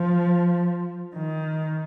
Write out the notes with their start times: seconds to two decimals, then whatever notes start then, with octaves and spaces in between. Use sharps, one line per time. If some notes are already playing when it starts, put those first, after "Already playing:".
Already playing: F3
1.15 D#3